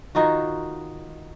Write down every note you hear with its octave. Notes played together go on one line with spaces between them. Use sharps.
D#3 D#4 F4 F#4